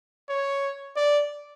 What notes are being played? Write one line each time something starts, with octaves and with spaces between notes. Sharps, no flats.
C#5
D5